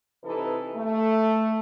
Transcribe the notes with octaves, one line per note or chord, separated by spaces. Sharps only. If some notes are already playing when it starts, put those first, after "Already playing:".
C3 E3 D#4 A4 B4
A3